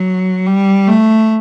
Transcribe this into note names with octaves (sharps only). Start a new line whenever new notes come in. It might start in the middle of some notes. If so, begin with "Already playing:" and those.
Already playing: F#3
G3
A3